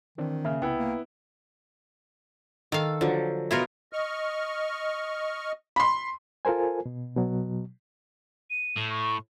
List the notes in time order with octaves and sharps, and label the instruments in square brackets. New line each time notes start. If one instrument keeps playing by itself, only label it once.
[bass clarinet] D#3 [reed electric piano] E3 C4 D4
[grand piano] C#3 [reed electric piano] A#3 F6 [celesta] E5
[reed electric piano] C2 [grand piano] B3 E4 [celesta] G5
[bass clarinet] A#3
[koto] D#3 F5 [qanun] A4
[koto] D3 [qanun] F3 F#3
[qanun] B2 B4 C#5 [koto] E4 F4 A#4
[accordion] D#5 C#6 F6
[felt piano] B5 C6
[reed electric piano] F4 A4 A#4 C5 G#5
B2
B2 F#3
[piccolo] D#7
[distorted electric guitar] A2
[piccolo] C#6